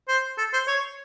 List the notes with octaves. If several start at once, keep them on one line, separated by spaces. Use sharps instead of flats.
C5
A4
C5
C#5